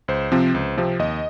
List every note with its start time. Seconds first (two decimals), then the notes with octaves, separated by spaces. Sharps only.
0.08 C#2 C5
0.32 C3 F3 C4
0.54 C#2
0.77 C3 F3 C4
0.99 D#2 D#5